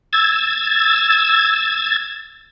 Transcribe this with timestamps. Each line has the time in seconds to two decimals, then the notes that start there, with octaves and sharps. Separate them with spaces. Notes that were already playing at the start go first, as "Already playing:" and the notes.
0.13 E6 G#6 A6